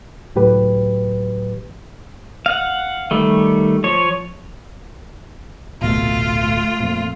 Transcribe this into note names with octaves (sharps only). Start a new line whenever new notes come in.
C#2 A2 F#3 G4 B4
F5 F#5
D#3 G3 A3
F3 C#5
D1 A#1 B2 A3 F4
F2 A#2